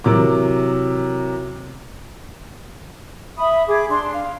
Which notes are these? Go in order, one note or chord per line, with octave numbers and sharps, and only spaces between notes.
C3 E3 F#3 A#4 D6
E5 B5 D#6
G#4 D6
D4 C6
F5